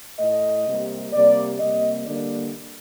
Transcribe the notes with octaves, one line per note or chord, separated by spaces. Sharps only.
A2 A3 D#5
C3 G3 A#3
C3 G3 A#3 D5
C3 G3 A#3 D#5
D3 G3 A#3 D5